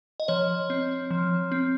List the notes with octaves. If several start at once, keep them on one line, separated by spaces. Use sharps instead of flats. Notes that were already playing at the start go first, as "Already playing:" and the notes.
D#5
F3 C#5
C4
F3
C4